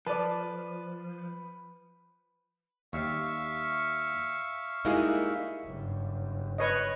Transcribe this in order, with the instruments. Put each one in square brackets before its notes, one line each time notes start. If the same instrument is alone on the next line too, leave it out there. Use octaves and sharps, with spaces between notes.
[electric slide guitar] F3 [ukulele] A4 D5 [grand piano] B4
[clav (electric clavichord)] D#2 G3 [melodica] E5 F5 C#6
[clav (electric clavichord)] G3 G#3 G#4 [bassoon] A#3 [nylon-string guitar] D#4 E4 F#4
[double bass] F#1 G2
[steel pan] B4 C#5 D#5